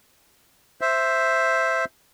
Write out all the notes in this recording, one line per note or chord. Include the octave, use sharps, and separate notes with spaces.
C5 E5